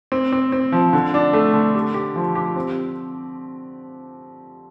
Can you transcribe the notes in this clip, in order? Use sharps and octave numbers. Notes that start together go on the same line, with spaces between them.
C4
C4
C4
F3
D3
D4
A3
D3
G4
G4
F3
G4
C4